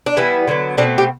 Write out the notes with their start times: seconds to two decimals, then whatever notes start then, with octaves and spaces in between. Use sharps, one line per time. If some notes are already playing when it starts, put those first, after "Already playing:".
0.06 D4
0.17 E3 G3 B3 E4
0.47 D3 F#3 B3
0.77 B2 A3 C4 D4
0.98 G4